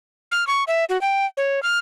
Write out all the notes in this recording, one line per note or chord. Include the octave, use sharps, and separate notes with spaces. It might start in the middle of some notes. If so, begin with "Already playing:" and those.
F6
C#6
E5
F#4
G5
C#5
F6